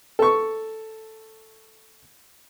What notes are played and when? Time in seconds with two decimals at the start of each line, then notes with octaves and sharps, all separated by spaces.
0.19 A4 C#6